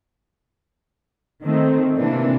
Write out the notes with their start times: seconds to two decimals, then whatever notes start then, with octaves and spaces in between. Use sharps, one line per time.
1.44 D#3 A3 C4
1.96 C3 E3 A#3 C4 D4